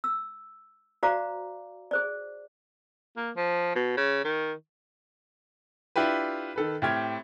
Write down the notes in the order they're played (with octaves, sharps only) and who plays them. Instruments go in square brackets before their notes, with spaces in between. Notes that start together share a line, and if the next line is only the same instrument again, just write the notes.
[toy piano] E6
F#4 C5 D5 F5 A#5 D6
G#4 C5 D5
[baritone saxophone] A#3
F3
B2
C#3
D#3
[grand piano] D4 E4 F4 G4 B4
D#3 A4 B4
A2 C4 G4 F6 G#6